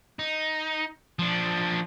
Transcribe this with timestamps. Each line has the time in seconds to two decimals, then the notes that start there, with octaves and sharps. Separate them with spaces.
0.19 D#4
1.19 F3 D4